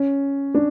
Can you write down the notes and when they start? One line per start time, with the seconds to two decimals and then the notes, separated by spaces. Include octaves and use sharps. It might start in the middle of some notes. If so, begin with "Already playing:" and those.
Already playing: C#4
0.54 D4